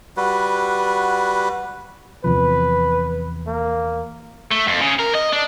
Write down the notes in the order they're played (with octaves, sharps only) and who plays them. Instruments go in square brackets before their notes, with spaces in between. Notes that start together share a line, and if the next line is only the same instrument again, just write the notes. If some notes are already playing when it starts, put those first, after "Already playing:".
[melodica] G3 F#4 B4
[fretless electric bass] E2 C3 F3 [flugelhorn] B4
[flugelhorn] A#3
[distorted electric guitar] A3
F2
C#3
A#4
D#5
D4